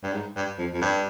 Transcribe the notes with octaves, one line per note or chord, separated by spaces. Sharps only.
G2
G#2
G2
F2
F2
G2